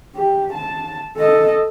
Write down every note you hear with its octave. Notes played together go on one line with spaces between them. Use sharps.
G4
A5
A4 D#5